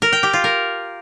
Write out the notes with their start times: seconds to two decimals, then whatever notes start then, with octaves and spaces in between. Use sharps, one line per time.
0.02 A#4
0.12 G5
0.23 G4
0.33 F4
0.44 A#4